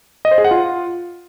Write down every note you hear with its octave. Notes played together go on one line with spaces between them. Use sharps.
D#5
C5
G#4
F#5
F4